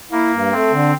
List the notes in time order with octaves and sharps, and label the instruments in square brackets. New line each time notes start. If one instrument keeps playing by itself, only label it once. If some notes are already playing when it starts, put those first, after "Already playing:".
[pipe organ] A#3 [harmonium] E4
[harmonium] G2
[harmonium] A3 [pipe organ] C4
[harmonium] D3